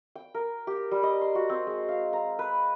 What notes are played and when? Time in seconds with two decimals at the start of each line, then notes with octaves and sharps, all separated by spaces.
0.15 G5
0.34 A#4
0.67 G4
0.91 G3
1.03 D#5
1.21 C6
1.35 F#4
1.49 C4
1.67 G#3
1.89 F5
2.13 A#5
2.39 B4